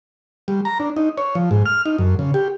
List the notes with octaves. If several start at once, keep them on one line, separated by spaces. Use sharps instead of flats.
G3
A#5
D4
D#4
C#5
F3
G#2
F6
D#4
F#2
C#3
G4